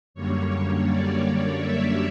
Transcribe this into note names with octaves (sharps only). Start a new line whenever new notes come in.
F#2 D3 G3 A#3 C#5
D5
E5